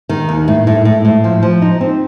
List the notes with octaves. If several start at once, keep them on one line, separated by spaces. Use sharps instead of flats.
D#3
D#2
A2
A2
A2
A2
F3
F3
D#4
C4